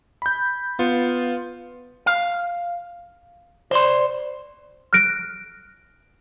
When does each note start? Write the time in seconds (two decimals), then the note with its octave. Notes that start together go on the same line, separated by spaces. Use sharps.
0.22 B5 G6
0.79 B3 F4
2.06 F5
3.71 C5 D5 C6
4.93 F6 F#6 A#6 D7